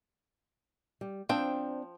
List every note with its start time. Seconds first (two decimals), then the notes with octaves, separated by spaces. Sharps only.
1.01 G3
1.29 F3 C4 D4 G5